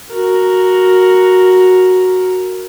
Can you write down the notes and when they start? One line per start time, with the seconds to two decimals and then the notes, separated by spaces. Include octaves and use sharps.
0.11 F#4 A#4